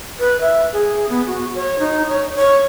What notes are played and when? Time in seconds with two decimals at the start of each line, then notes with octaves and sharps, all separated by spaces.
0.19 B4
0.41 E5
0.73 G#4
1.09 B3
1.27 F#4
1.55 C#5
1.79 D#4
2.09 C#5
2.36 C#5